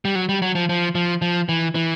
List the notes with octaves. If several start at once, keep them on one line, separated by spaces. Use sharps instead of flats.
G3
F#3
G3
F#3
F3
F3
F3
F3
E3
E3